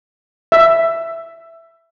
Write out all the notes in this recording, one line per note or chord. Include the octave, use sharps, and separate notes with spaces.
E5